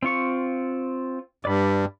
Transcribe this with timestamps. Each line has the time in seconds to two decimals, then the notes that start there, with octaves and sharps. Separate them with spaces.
0.03 C4 F4 C#6
1.45 G2 D5 B5